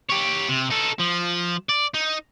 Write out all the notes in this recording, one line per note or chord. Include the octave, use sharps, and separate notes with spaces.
G4 C#5
C3
D#4 A4
F3
D5
D#4